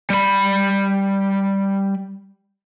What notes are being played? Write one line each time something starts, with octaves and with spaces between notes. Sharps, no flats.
G3 B5